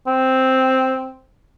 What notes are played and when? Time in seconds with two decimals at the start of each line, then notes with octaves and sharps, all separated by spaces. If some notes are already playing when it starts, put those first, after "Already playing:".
0.07 C4